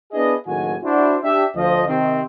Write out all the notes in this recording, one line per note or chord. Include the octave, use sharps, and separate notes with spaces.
B3 D4 E4 G#4 B4 D#5
F#1 A2 D#3 F#3 F#4 G#5
D4 E4 F#4 C5
D4 G4 E5
D2 F3 D#5
C3 D#3 C4